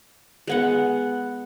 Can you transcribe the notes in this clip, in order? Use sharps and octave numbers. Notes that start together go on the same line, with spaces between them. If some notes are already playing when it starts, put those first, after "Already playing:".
G#3 B3 F#5